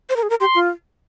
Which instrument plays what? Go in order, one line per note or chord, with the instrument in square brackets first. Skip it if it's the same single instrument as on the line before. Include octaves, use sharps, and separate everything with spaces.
[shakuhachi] C5
A#4
G#4
A#4
[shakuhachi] G4 [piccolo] C6
[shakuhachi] F4